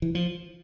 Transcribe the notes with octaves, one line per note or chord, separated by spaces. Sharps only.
E3
F3